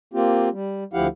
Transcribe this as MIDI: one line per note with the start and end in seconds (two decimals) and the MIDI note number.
0.14 0.49 58
0.14 0.49 60
0.14 0.49 65
0.14 0.49 67
0.52 0.84 55
0.93 1.07 38
0.93 1.07 53
0.93 1.07 64
0.93 1.07 67
0.93 1.07 77
0.93 1.07 78